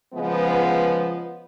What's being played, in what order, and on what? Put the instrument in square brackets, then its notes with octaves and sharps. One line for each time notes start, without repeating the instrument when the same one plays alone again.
[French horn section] C#3 F3 G#3 B3